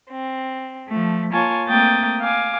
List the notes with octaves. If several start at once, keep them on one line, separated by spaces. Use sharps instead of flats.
C4
F3 A3
A#3 F4 C#5 G#5 A5
A3 A#3 C4 G5 D#6 A6
F5 G#5 D6